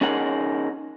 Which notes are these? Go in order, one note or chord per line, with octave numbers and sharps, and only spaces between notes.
C#4 D#4 G#4 A#4 F#5